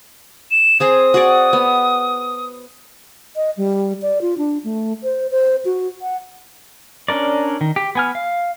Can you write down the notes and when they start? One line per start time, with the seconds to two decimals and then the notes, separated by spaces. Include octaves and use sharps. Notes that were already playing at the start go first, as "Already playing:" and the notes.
0.51 E7
0.80 C4 G#4 C5 D#6
1.14 F#4 G#4 D5
1.53 B3
3.36 D#5
3.57 G3
4.02 D5
4.22 F4
4.38 D4
4.64 A3
5.03 C5
5.31 C5
5.65 F#4
6.02 F#5
7.08 C#4 D4 A#4 D5
7.61 D#3
7.76 G4
7.95 B3 G#5 F6
8.15 F5